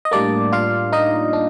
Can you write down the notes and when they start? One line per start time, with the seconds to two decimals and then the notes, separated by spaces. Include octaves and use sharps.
0.05 D#5
0.11 A2 G3 A#3 D4 D5
0.53 F4 F5
0.93 D#4 D#5
1.33 D4